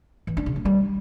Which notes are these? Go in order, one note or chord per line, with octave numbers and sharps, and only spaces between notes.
E3
D4
C#3
A3
G3